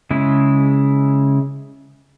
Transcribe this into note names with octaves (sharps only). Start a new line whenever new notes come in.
C#3 G#3 E4